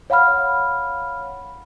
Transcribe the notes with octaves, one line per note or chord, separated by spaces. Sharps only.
C#5 F5 F#5 B5 F6